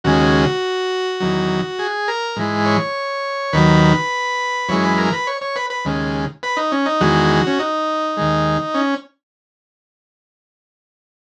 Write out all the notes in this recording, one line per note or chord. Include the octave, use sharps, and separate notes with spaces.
D#2 C#3 G#3 F#4
E2 D#3 F#3
G#4
A#4
G#2 E3 G#3
C#5
D#2 D#3 F#3 B4
F#2 E3 G#3 C#5
B4
A#4
B4
C#5
C#5
B4
B4
D#2 C#3 G#3
B4
D#4
C#4
D#4
E2 D#3 G#3 F#4
C#4
D#4
D#2 D#3 G#3
C#4